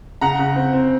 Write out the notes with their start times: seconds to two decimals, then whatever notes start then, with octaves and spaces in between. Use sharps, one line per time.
0.21 C#3 F#5 A#5
0.39 C#3
0.56 C4
0.73 C4